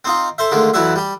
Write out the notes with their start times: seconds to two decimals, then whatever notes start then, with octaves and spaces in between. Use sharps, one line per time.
0.05 C4 D#4 F4
0.38 A4 C5 E5
0.51 D3 D#3 F3 G#3 A3
0.74 F2 E3 F#3 F#4 D5 E5
0.95 G3 G4